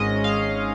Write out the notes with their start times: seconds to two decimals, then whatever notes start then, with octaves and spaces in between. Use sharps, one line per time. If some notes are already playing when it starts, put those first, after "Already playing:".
Already playing: G#1 G#2 G#3 C#4 D#5
0.24 F5